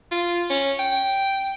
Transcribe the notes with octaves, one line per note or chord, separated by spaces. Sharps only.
F4
C#4
G5